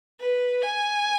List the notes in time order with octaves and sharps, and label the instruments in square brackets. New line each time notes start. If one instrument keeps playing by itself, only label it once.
[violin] B4
G#5